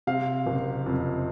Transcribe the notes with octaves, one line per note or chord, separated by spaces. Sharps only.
C3 F5
F#1
F2